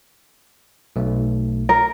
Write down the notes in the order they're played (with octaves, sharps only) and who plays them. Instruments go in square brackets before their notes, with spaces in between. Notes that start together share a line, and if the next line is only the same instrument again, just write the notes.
[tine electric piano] B1 A3
[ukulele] A#4